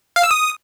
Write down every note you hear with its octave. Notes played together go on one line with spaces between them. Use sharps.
F5
E6
D#6